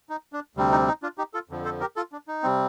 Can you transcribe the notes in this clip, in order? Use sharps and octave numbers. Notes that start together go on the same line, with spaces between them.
D#4
D4
D2 C3 G3 C4
D#4
D#4
D4 F4
D#4 G4
F4 A4
F2 D3 F3
A4 C5
G4 A#4
F4 A4
D4
D#4
C3 G3 C4